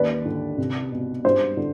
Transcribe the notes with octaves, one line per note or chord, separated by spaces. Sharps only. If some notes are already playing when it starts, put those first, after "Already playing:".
Already playing: D#2 B4 D5
D3
C2
B2
G2 C5
D3